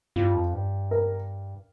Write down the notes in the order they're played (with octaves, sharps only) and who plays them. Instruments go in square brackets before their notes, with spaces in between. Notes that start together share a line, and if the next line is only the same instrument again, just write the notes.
[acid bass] G2 [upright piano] F4
[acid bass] F2
G2
[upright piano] A#4